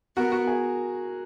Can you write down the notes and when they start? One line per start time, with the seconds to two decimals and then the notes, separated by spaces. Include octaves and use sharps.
0.16 B3 F#4 A#4
0.32 F#4
0.47 G#4